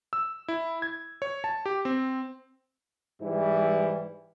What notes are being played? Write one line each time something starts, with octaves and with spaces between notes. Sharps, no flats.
E6
E4
G#6
C#5
A5
G4
C4
G#2 E3 G3 E4